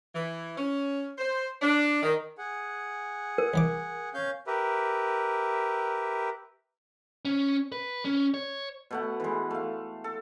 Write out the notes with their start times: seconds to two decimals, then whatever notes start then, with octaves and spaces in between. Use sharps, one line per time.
0.14 E3
0.57 C#4
1.18 C5
1.61 D4
2.02 D#3
2.38 G#4 F#5
3.38 A#4
3.54 C2 E3 D6
4.14 C#4 F5 G6
4.47 G4 A#4 B4 E5
7.25 C#4
7.72 B4
8.05 C#4
8.34 C#5
8.91 B2 A3 F#5
9.20 E3 G#3
9.51 A3 F5
10.04 A4